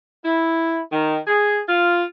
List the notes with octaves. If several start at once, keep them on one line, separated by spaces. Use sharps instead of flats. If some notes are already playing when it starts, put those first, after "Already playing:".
E4
D#3
G#4
F4